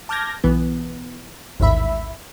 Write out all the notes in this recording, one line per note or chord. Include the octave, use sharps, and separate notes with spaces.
A5 D6 F6 G6 G#6 A#6
B1 E3 B3
A1 D#2 G#2 E5 B5